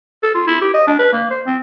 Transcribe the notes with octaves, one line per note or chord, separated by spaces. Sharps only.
A4
F4
E4
G4
D#5
D4
B4
A#3
C5
C4